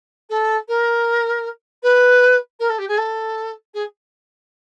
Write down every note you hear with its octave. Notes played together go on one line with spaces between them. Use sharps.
A4
A#4
B4
A#4
A4
G4
G#4
A4
G#4